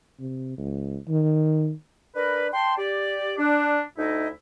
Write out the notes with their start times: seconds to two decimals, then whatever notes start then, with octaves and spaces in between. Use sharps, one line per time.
0.19 C3
0.58 C#2
1.08 D#3
2.15 D4 A#4 B4
2.52 G5 A5 C6
2.77 G4 D5
3.38 D4
3.98 D2 D#4 E4 D#5